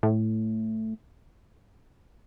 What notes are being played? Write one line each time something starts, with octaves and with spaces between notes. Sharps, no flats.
A2